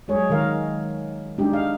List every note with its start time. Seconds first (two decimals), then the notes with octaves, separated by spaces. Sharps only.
0.08 F#3 G#3 G#4 C#5
0.30 D#3 G#3 A#4 F5
1.38 G#3 D4 D#4 G4
1.53 F5